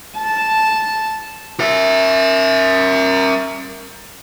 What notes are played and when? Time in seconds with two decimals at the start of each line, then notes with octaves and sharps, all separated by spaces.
0.17 A5
1.60 A#4 E5